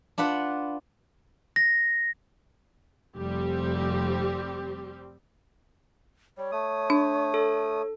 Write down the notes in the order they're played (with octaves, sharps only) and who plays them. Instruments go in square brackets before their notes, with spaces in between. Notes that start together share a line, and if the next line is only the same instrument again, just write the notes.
[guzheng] D4 F4 B4 F#5
[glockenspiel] A#6
[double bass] F1 [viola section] G3 C4 G4
[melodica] G3 [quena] C#5
[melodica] A3 D#6
[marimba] D4
[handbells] A4